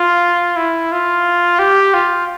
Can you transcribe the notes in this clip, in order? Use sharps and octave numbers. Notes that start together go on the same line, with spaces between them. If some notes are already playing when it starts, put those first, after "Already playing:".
Already playing: F4
E4
F4
G4
F4